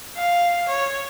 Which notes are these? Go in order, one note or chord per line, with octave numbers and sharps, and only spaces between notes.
F5
C#5